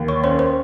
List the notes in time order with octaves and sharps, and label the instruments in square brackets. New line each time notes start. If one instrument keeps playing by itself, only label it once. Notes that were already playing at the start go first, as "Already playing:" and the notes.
Already playing: [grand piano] D#2
[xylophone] C#5 C#6
[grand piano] C#4 [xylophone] C5 C6
[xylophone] C5 C6